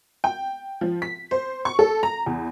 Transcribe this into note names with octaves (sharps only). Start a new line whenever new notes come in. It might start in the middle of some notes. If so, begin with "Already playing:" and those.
G5
F3
B6
C5
C#6
A4
A#5
E2